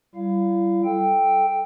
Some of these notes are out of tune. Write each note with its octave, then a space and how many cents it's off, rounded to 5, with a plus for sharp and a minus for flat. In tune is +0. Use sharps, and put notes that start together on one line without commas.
G3 -30 E4 +40 F5 +0
A4 -10 G5 +0